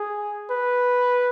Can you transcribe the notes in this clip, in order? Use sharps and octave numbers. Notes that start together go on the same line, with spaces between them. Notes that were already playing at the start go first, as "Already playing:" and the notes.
Already playing: G#4
B4